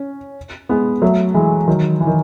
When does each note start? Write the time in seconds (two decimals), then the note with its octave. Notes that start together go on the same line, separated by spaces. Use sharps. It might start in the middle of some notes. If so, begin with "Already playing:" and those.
Already playing: C#4
0.69 G#3 B3
1.02 F#3 A3
1.34 E3 G#3
1.68 D#3 F#3
2.00 E3
2.07 D#3